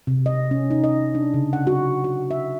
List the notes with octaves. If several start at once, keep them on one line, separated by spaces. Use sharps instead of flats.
C3
D#5
C#4
D#4
D#5
D4
C#3
F#5
F#4
F#4
E5